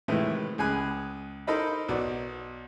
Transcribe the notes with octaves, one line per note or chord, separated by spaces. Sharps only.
A2 C3 D#3 E3 G#3 A3
C#2 G#4 G#5 B5 F#6
D#4 A4 A#4 C5 D#5 B5
B1 F#4 D5